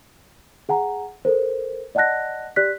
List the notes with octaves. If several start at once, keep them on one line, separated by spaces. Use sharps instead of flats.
G#4 F#5 G#5 A#5
A4 A#4 C5
D5 D#5 F#5 A5 F#6 A#6
G4 D5 F#6 B6